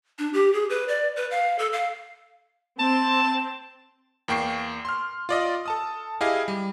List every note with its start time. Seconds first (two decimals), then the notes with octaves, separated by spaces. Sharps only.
0.19 D4
0.33 G4
0.53 G#4
0.70 B4
0.88 D5
1.16 B4
1.31 F5
1.59 A4
1.73 F5
2.79 C4 A5
4.28 E2 A#3 G5 C#6 C7
4.85 C6 F6
5.29 F4 D5 D#5
5.66 A4 A5 D#6
6.21 E4 G4 G#4 D#5 F5
6.48 G3